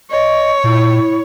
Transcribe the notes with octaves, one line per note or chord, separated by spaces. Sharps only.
C#5 D#5
A#2 E4